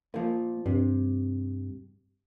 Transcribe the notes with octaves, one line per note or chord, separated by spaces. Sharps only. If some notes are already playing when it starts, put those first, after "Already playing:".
A#2 F3 A#3
G2 C3